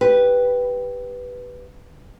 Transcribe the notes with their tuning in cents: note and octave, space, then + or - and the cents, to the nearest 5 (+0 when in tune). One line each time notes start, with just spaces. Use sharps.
G4 +0 B4 +0